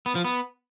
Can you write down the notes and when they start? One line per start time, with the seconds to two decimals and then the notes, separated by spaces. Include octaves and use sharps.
0.06 B3
0.15 F3
0.24 B3